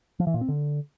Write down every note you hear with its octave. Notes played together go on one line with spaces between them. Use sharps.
F3
E3
A#2
C4
D3